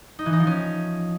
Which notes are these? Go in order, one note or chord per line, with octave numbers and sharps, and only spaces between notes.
D#4
E3
D#4
F3
C#4